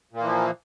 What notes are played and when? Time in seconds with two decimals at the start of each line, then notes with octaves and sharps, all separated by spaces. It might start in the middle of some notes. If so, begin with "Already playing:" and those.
0.13 A#2
0.17 A#3
0.21 E3
0.25 F3